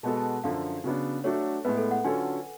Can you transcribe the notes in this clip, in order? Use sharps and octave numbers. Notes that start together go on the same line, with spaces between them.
B2 G#3 B3 F#4 A4 A5
A5
A5
F#2 D3 F3 F5
C#3 F#3 B3 D4
F#3 A3 D4 F#4 A4 C#5
A2 G#3 B3 B4
A4
F#5
D3 F#3 C#4 F4 A4 G#5